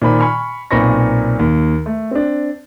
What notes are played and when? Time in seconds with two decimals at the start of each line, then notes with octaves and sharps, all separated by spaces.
0.02 A#2 D#3 C5 B5
0.20 G#5 B5 C#6 F6
0.71 B1 A#2 C4 B5 C#6 A#6
1.39 D#2
1.86 A3
2.11 C4 D4